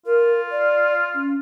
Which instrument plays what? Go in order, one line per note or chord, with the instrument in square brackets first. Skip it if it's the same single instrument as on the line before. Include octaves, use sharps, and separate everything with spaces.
[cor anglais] F4 [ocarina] A#4
[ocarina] D5
C#4